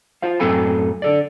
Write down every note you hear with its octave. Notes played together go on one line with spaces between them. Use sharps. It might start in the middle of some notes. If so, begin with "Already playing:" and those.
F4 C5 F5
F#2 A2 C4 A4 G#5 B5
D3 A4 D5